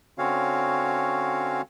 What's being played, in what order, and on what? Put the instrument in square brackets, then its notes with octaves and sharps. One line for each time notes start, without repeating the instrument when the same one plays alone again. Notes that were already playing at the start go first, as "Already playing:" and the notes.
[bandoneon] D3 C4 C#4 F#4 C#5 F5